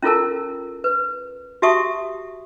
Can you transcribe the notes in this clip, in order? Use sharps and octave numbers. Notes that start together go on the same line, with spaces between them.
C#4 E4 F4 A4 A#4 A5
B4
F#4 G4 E5 A5 C#6 D#6